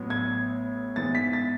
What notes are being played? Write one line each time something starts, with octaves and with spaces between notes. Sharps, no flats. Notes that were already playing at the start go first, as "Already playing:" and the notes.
Already playing: A1 A2 F#3 B3
G#6
G#2 E3 B3 A6
B6
A6